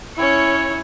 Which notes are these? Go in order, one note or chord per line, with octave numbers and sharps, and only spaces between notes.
C#4 E4 C#5